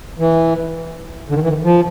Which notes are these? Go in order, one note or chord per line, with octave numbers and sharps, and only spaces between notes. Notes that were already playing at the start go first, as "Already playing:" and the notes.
E3
D3
D#3
E3
D#3
F3